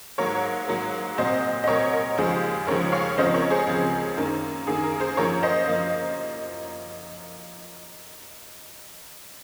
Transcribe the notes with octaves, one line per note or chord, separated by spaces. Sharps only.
G#2 F#3 A#3 A#4 C#5
G#2 F#3 A#3
C2 A#2 F#3 C4 C5 D#5
D#5
C2 A#2 F#3 C4 A#4 C#5
A#4
D#2 C#3 F3 G#3 G#4 C5
D#2 C#3 F3 G#3 A#4 C#5
C#5 F5
C#2 C#3 F3 C4 C5 D#5
A#4 C#5
G#4 C5
C#2 C#3 F3 C4
F#2 D#3 A#3
F#2 D#3 A#3 G#4
A#4
G#4 C5
F#2 F3 A#3 A#4 C#5
C5 D#5
F#2 F3 A#3